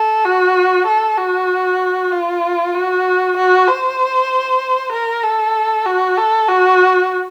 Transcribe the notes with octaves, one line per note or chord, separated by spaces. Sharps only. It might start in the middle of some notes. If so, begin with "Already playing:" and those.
Already playing: A4
F#4
A4
F#4
F4
F#4
F#4
C5
A#4
A4
F#4
A4
F#4